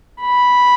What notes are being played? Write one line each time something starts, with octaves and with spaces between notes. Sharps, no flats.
B5